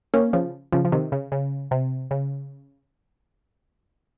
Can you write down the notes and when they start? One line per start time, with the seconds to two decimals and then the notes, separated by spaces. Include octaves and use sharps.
0.14 A#3 C#4
0.33 C#3 F3
0.72 C#3 F3
0.85 F3
0.92 C3 D#3
1.12 C#3
1.32 C#3
1.71 C3
2.11 C#3